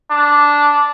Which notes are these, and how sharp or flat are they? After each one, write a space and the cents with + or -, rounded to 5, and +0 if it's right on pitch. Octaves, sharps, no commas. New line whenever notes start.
D4 -5